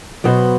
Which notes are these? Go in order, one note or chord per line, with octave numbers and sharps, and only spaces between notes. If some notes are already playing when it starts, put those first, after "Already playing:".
B2 F#3 B3 F#4 C5